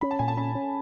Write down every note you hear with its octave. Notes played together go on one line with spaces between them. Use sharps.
C#4 B5
A5
A#2 G#5
A5
C#4 B5
C#4